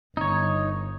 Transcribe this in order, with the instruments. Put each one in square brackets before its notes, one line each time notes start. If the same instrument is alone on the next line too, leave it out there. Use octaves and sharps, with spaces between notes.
[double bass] G1 [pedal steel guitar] D#4 C#5